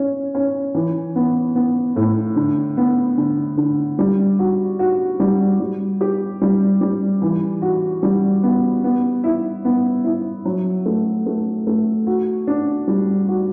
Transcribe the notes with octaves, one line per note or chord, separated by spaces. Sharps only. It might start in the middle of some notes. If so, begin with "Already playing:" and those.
Already playing: C#4
C#4
E3
B3
B3
A2
D3
B3
D3
D3
G3
F#4
F#4
G3
G3
G4
G3
G3
E3
F#4
G3
B3
B3
E4
B3
E4
F#3
A3
A3
A3
F#4
D4
G3
F#4